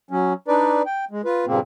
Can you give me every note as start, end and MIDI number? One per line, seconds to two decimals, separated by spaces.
0.11 0.33 54
0.11 0.33 61
0.48 0.82 62
0.48 0.82 63
0.48 0.82 71
0.48 0.82 74
0.86 1.05 79
1.11 1.22 56
1.25 1.45 65
1.25 1.45 71
1.46 1.60 43
1.46 1.60 46
1.46 1.60 49
1.46 1.60 58
1.46 1.60 60